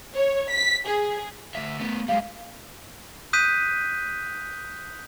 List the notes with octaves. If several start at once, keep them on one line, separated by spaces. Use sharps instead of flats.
C#5
B6
G#4
D2 E5
A3 B3
G3 G#3 F5
D#6 F#6 G6 B6 D#7